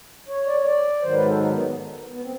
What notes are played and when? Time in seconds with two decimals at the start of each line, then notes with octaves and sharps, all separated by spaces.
0.28 C#5
0.47 D5
0.56 C#5
0.66 D5
1.02 G#2 D#3 F#3 C5
1.14 B4
1.26 A4
1.38 D#4
1.51 B3
2.11 B3
2.21 C4